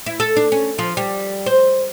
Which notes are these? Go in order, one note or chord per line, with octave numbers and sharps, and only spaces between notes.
E4
A4
D4
C#4
F3
G3
C5